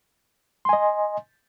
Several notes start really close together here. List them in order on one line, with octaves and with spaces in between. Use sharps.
C6 G#5 D#5